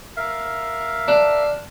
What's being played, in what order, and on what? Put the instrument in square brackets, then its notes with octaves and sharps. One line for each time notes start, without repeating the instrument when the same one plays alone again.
[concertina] A#4 E5 F5
[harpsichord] D4